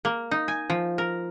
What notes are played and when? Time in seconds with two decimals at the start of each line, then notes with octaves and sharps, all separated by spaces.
0.05 A#3
0.31 D#4
0.48 G#5
0.70 F3
0.98 A#4